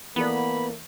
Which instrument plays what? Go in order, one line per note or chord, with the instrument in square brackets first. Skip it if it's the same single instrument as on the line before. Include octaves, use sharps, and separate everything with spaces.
[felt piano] E3 A4 D5 [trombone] A#3 [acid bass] B3 [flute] B5